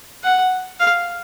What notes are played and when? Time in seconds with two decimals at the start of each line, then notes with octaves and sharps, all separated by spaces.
0.23 F#5
0.80 F5